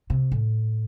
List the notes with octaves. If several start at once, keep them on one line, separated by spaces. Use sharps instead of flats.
C3
A2